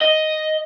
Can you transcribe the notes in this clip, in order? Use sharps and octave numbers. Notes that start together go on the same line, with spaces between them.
D#5